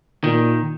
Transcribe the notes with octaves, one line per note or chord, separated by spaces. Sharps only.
A#2 D#3